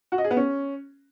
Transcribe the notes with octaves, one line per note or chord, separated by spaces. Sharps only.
F#4
D#5
G#4
B3
C#4